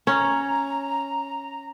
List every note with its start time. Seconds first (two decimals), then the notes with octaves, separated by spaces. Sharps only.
0.07 C#4 A#5